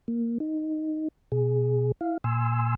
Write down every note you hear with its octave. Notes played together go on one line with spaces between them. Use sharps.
A#3
D#4
B2 G#4
E4 F5
A#2 G#5 C6 E6